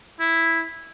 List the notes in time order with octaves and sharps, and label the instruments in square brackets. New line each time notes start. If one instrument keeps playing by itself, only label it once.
[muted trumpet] E4